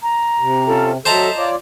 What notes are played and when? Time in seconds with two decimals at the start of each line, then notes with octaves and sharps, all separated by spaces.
0.02 A#5
0.40 C3
0.67 C#4 F4 A4
1.06 F#3 A4 C5 D#5 E5 A5 A#5
1.36 F4 C#5 D5